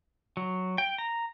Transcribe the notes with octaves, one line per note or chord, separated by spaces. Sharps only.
F#3
G5
A#5